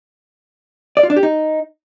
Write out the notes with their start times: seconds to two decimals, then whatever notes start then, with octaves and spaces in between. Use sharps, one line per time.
0.97 D5
1.03 F4
1.10 D4
1.16 G4
1.23 D#4